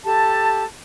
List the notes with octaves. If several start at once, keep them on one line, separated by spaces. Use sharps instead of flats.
G4 A4 A5